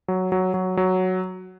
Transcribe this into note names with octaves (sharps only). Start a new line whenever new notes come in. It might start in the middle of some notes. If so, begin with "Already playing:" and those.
F#3
F#3
F#3
F#3